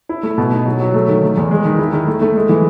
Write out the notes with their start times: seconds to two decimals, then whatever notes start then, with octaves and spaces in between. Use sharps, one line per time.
0.09 E4
0.23 A3
0.38 B2
0.52 D#4
0.66 F#3
0.80 F#3
0.94 A3
1.08 D#3
1.23 D#3
1.37 E2
1.51 G#3
1.65 D#3
1.79 E4
1.93 D#3
2.07 A3
2.21 A3
2.36 G#3
2.49 E3